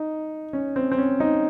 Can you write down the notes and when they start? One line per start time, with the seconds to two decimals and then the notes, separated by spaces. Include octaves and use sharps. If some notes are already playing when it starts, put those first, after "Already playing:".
Already playing: D#4
0.53 C#4
0.76 C4
0.92 C4
0.98 C#4
1.20 D#4